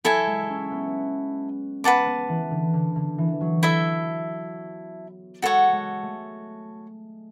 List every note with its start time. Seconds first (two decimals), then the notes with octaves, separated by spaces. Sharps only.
0.04 F#3 E4 A4 E5 G#5
0.27 G#3
0.50 C#4
0.71 B3
1.84 B3 B4 F#5 A5 D6
2.06 B3
2.29 E3
2.51 D3
2.74 D3
2.96 D3
3.18 E3
3.41 F#3
3.63 E4 A4 E5
5.42 G#3 F#4 A4 C#5 F#5
5.72 G#3
6.02 A3